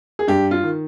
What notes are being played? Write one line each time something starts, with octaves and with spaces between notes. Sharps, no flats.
G#4
G2 G4
F4
D#3